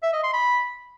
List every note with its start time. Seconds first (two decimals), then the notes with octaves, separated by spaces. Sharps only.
0.03 E5
0.13 D#5
0.23 C6
0.33 B5